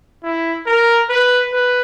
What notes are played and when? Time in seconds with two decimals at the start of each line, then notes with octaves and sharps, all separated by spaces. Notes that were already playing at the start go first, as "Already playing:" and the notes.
0.23 E4
0.67 A#4
1.10 B4
1.53 B4